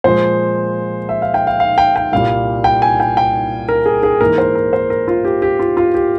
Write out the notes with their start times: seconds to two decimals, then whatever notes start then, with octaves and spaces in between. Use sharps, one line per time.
0.04 A#2 F3 G#3 C5
1.09 E5
1.22 F5
1.34 G5
1.47 F5
1.60 F5
1.78 G5
1.96 G5
2.12 C2 A#2 G3 F5
2.64 G5
2.82 G#5
3.00 G5
3.17 G5
3.69 A#4
3.86 G#4
4.03 G#4
4.21 G#2 E3 A#3 A#4
4.38 C5
4.55 A#4
4.73 C5
4.90 A#4
5.08 F4
5.25 G4
5.42 G4
5.59 F4
5.77 F4
5.94 G4